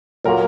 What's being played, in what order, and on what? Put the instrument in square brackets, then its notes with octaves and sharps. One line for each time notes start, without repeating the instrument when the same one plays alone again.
[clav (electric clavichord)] A#2 F#3 A#3 [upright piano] A#4